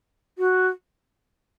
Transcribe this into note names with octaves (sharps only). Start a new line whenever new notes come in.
F#4